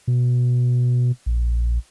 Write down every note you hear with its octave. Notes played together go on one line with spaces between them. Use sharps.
B2
A#1